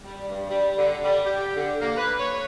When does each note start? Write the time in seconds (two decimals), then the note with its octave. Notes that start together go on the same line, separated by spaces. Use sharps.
0.04 G3
0.29 G2
0.50 G3
0.77 D3
1.04 G3
1.25 G4
1.56 D3
1.80 A#3
1.97 B4
2.20 C#5